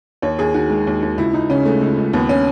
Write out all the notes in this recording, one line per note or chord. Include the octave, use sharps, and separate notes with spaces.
D#2 C#5
D#2 G#4
D#3 F#4
G#3
D#2
D#2
C#2 E4
C#2 D#4
C#3 C#4
G#3 A3
C#2
C#2
D#2 B3
C#4